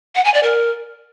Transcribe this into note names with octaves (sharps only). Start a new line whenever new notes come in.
F#5
G#5
D5
A#4